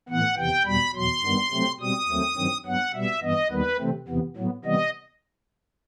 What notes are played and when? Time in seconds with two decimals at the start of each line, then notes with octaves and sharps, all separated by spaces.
0.09 A2 E3 B3 F#5
0.37 E2 C3 E3 G5
0.66 E2 B2 G3 B5
0.95 E2 B2 F#3 C6
1.23 G2 D#3 G3 B3
1.51 C3 F#3 A3 C4
1.80 B2 G3 C4 D#6
2.08 D#2 D#3 F#3 A3 C4
2.37 G2 D#3 F#3 C4
2.66 G2 F#3 B3 F#5
2.94 B2 G3 B3 E5
3.22 G2 E3 B3 D#5
3.51 D#2 D#3 G3 B3 B4
3.79 C3 E3 A3 C4
4.08 E2 C3 E3 B3
4.36 A2 F#3 B3
4.65 C3 E3 G3 B3 D#5